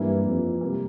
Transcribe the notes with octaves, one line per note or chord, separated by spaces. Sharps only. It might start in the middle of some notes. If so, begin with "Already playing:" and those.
Already playing: G2 E3 A#3 E4
F2
C3 G3 A#3